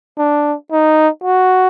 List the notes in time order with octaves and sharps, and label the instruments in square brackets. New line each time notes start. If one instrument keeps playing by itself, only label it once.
[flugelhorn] D4
D#4
F#4